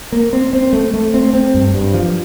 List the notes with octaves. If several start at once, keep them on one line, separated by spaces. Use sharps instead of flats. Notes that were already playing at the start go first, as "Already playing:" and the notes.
A#3
C4
C4
A3
A3
C4
C4
G2
G2
F3